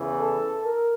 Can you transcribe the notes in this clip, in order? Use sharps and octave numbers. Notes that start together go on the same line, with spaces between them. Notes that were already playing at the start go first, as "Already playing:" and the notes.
Already playing: E2 C#3 E3
A4
A#4